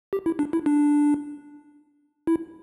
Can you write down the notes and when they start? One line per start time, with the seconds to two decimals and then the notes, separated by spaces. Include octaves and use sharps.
0.13 G4
0.26 E4
0.39 D4
0.53 E4
0.66 D4
2.27 E4